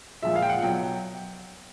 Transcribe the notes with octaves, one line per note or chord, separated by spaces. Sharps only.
A#2 F3 G#3 E5
F5
G5
F#5
B2 F#3 G5